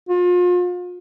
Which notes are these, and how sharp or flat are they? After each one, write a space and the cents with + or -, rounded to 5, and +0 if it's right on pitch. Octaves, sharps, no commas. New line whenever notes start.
F4 +35